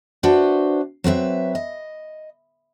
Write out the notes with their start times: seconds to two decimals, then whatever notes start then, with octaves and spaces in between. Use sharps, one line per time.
0.23 D4 F#4 B4 C5 E5
1.04 F#3 C4 B4 E5
1.55 D#5